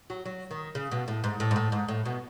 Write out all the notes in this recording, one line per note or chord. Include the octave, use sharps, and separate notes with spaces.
F#3
F#3
D#3
C#3
B2
A2
G#2
A2
G#2
A2
G#2
A2
B2